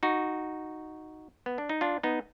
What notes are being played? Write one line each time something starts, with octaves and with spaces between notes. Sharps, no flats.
D#4 F#4
B3
D4
D#4
D4 F4
B3 D#4